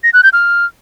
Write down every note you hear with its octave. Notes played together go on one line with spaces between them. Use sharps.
A#6
F#6
G6
F6